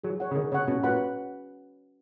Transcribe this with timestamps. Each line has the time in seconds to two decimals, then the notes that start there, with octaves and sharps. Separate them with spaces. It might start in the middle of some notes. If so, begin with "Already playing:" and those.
0.04 F#3 G#4
0.20 C#5 F#5
0.31 C#3
0.35 D#3 G#4
0.52 C#3 C#5 F#5
0.68 B2 C#4
0.83 A#2 F#4 B4 F#5 B5